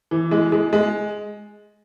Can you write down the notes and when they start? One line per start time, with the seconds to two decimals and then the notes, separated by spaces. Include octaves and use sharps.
0.11 E3
0.31 G#3
0.52 G#3
0.73 G#3